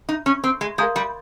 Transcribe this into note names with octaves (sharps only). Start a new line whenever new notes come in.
D#4
C#4
C4
G#3
G#3 A#4 F5 A#5 D#6 G6
G3